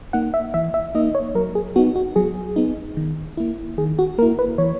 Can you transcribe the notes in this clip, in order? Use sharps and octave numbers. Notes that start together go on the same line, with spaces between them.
A#3 D#4 F#5
E5
E3 E5
E5
A#3 D#4 D#5
C#5
F#3 A#4
G#4
B3 D#4 F#4
F#4
F#3 G#4
B3 D#4
D#3
A#3 E4
D#3 G#4
F#4
A#3 E4 A#4
B4
E3 C#5